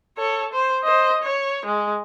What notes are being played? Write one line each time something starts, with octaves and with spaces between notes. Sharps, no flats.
A4 C#5
C5
C5 D#5
C#5
G#3